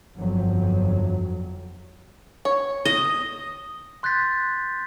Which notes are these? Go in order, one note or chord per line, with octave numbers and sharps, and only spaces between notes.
G1 F2 F#3
C#5
D#5
C6 F#6 G6 A6 B6